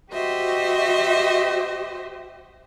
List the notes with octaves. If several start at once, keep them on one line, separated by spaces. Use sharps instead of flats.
F#4 G4 C5 D#5 E5